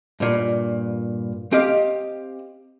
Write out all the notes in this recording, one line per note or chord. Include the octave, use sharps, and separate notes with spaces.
G2 A#2
C4 G4 D#5 F5